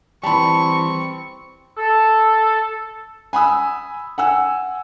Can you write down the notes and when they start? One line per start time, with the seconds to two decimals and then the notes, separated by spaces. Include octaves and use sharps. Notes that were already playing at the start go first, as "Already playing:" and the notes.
0.24 E3 G3 C4 A5 B5 C#6
1.77 A4
3.33 G#5 B5 D#6 E6
4.18 F#5 G#5 E6